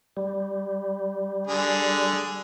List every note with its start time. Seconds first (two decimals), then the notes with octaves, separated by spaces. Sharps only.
0.17 G3
1.47 D3 G#4